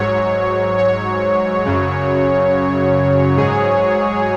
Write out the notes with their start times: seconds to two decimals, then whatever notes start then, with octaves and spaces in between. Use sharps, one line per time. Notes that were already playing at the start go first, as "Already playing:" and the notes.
Already playing: G#2 F#3 C#5
0.78 C#5
1.64 F#2 C#3 F#3
3.36 G#2 F#3 G#4